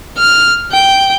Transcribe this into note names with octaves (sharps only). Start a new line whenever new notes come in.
F6
G5